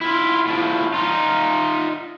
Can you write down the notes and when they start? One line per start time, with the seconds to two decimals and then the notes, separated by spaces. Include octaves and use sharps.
0.01 E4 F4
0.47 A2 F3
0.94 D#4 F4